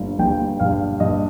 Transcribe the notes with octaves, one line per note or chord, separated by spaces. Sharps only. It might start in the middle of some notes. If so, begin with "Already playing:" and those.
Already playing: G1 G2
G1 G5
G2 F5
G2 D#5